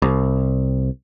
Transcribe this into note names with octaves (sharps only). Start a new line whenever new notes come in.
C2